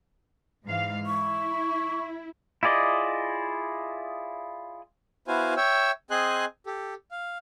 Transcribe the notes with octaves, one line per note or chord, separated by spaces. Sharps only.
G#2 E3 F5
E4 C#6
E4 F4 G#4 D5 D#5
B3 E4 F#4 C5 F5 G#5
C#5 E5 G5 E6
C4 G#4 D#5 G#5 C6 F#6
G4 A4
F5